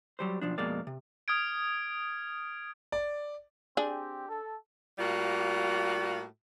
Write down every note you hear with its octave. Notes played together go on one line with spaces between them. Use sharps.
F#3 G3 C5
B1 F3 D4
F2 B2 G#3 A#3 D5
C3
D#6 F6 G#6 D7
D5
C4 D4 G4 G#4
A4
A2 G3 A#3 F4 F#4